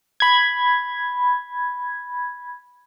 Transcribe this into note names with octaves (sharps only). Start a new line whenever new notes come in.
B5 G#6